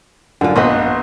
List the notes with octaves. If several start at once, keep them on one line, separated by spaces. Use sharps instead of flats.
F#2 D3 F4
A#1 B3 B4 D#5 C6